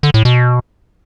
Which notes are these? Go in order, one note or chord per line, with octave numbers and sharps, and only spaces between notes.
D3
A2
B2